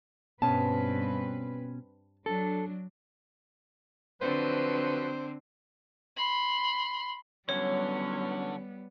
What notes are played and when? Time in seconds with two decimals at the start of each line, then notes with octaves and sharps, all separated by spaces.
0.42 G2 B2 C4 C#4 B4 A5
2.26 F#3 D4 A4
4.22 D3 F3 F#3 C4 B4 C5
6.16 B5 C6
7.49 D3 E3 F#3 G3 B3 C#4 C#5